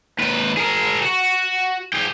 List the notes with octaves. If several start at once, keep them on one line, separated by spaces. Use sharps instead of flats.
D#2 B4
G#4 A#4
F#4
G#4 G5